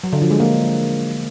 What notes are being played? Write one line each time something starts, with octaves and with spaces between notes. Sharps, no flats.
F#3
D3
F3
G#3
A#3